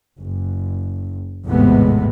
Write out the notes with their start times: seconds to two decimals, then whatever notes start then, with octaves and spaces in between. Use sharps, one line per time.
0.20 F#1
1.47 G#1 E2 A2 C3 G#3 B3